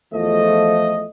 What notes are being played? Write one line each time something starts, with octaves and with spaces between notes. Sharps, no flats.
E2 F3 A3 D#5